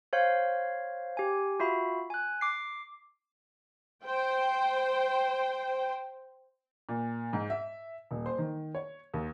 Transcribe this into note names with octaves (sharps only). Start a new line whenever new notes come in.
C5 C#5 F5
G4 G#5
F4 F#4 E5 B5
G#5 F#6
D6 C7
C5 G5
A#2
G#2
E5
D#1
C5
D#3
C#5
D#2